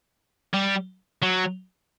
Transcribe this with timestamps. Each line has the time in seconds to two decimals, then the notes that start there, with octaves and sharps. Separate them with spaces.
0.54 G3
1.22 F#3